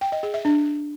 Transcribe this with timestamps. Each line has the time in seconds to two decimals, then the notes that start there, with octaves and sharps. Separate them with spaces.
0.01 G5
0.12 D#5
0.23 G#4
0.34 E5
0.45 D4